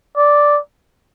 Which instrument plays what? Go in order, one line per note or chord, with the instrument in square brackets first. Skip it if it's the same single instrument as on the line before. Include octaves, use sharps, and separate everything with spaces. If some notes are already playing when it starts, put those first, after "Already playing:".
[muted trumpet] D5